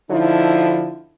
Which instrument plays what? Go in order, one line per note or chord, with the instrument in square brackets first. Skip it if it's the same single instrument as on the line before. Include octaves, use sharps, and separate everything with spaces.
[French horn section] D3 F3 D#4 E4